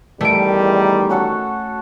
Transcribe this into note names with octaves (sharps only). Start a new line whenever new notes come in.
E2 D#3 G3 A3 D7
C#4 F#4 A4